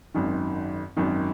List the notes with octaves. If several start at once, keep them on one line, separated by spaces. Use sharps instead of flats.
G#1 F#2 D#3
G#1 F#2 D#3